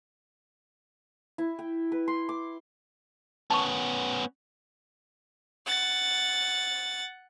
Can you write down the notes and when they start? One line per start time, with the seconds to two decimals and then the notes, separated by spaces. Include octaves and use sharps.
1.38 E4
1.59 G5
1.92 B4
2.08 C6
2.29 D6
3.51 B3 C#4 A5 C#6
5.67 F#5 A6